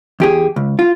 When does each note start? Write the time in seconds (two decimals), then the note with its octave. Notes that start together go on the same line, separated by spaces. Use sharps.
0.20 E2 G4 G#4
0.56 C#2
0.79 F4